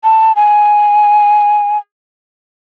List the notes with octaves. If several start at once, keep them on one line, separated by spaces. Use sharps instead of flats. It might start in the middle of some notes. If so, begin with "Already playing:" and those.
A5
G#5